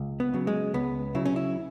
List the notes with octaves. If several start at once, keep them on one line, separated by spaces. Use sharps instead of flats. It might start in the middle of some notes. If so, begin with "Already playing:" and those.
Already playing: C#2
B3
C#3 F#3
G#3
C#2 B3
C#3 F#3 E4
C#4
E4